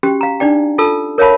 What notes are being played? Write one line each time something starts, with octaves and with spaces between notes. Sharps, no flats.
C#4 F#4 G4 G5
F5 A#5
D4 D#4 D5 G5
F4 A4 A5 E6
A#4 C#5 E5 F5 A5 B5